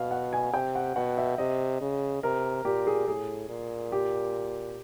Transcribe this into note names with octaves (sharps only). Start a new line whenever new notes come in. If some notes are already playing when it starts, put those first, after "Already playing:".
Already playing: B2 F5
F#5
G#5
C3 G5
F#5
B2 F#5
E5
C3 D#5
C#3
C3 A#4
A#2 G4
G#4
A2 G#4
A#2
G4